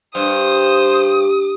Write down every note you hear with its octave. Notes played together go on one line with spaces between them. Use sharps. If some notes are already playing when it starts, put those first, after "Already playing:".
G2 C5 D#6